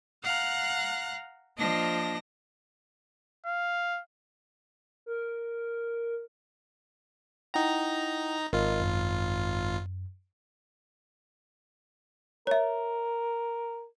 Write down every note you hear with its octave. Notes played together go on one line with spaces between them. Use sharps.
F5 F#5 A#5 F#6
F3 A#3 D4 D#5 A5 A#6
F5
A#4
D#4 E4 F#5 G5 A#5
G#1 F4 A#4 D#5
F#2
A#4 C#5 E5